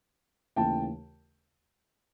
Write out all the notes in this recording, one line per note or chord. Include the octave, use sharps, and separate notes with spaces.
D#2 C#3 E3 A3 G5 A5